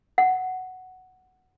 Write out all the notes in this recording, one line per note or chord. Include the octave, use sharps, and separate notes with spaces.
F#5